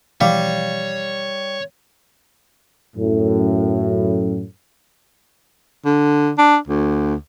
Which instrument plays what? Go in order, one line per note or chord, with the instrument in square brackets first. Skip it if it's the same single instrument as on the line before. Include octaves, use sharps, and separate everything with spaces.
[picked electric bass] B2 E3 F3 [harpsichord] G3 [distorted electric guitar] C#5 [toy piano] F5 D6
[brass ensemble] F#2 A2
[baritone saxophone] D3
D4
D2